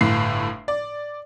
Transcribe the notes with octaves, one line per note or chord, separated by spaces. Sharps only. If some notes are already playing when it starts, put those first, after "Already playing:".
G1 A2 C7
D5